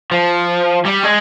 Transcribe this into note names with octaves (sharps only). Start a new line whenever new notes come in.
F3
G3
G#3